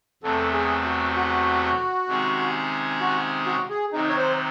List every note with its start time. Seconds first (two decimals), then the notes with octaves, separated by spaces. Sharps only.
0.23 E2 C3 F#3 A3 A4
0.53 G#4
0.84 F#4
1.15 F#4
2.08 C3 D#3 G#3 C#4 G#4
3.00 F#4
3.46 F#4
3.70 G#4
3.93 C3 D#3 F#3 D#4
4.08 C#5
4.16 C5